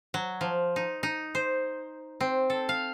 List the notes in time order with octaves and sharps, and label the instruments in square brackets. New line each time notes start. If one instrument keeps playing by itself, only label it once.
[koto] F#3
F3
D#4
D#4
C5
C4
A4
F5